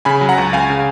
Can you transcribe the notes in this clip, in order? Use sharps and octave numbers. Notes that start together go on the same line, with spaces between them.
C#3 G#5 B5
F#3
F#5 A#5
C#2
C#2 F5 G#5
C#3